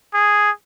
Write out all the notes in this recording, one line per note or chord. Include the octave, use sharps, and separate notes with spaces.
G#4